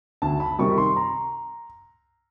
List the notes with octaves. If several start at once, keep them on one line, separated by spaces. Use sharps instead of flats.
D2 A5
B5
C3 D#3 G3 C#6
C6
A#5